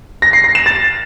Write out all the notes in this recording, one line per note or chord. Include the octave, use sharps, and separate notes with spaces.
A#6
C7
A#6
E7
A6